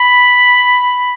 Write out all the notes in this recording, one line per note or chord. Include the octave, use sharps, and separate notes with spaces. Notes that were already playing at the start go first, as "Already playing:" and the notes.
Already playing: B5